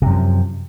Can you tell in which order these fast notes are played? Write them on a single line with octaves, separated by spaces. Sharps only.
C3 F#2 F3